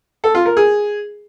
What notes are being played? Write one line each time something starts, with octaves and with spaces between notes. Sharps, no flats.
A4
F4
A#4
G#4